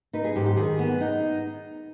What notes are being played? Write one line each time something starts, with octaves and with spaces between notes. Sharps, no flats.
D#4 B4
G#4
G#2 G4
G4
D#3 G#4
B3
D#4